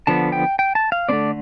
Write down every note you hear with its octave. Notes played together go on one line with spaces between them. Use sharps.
D3 F3 B3 A5
G5
G5
A5
F5
D3 A3 C4 D5